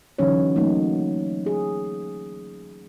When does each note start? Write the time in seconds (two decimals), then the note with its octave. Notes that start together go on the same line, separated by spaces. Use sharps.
0.19 D3 E3 F#3 C#4 D#4 C#5
0.56 F#3 A3 A#3 D#4
1.46 G#4